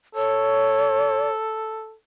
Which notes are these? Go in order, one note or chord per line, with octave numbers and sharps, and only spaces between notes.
A4 C#5